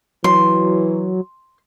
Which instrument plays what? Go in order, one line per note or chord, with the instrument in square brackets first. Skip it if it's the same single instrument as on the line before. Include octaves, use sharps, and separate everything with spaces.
[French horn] E3 [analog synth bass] F#3 [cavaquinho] C6